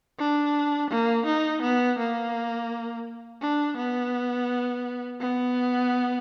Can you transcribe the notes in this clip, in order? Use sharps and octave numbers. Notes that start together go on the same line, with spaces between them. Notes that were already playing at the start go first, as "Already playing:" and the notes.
D4
A#3
D#4
B3
A#3
D4
B3
B3